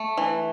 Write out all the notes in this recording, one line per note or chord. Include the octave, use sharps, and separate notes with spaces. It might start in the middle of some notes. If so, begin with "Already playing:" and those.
Already playing: A3
E3